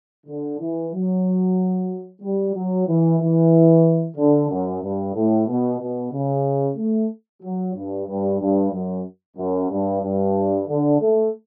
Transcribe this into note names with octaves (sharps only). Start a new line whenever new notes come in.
D3
E3
F#3
G3
F#3
E3
E3
D3
F#2
G2
A2
B2
B2
C#3
A3
F#3
G2
G2
G2
F#2
F#2
G2
G2
D3
A3